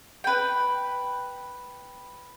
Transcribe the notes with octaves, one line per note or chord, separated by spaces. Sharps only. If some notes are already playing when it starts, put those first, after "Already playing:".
B4 G5